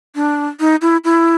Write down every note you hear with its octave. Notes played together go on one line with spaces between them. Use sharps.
D4
D#4
E4
E4